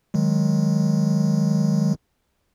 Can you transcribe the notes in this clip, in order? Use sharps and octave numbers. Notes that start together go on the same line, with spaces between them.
D#3 F#3 G#3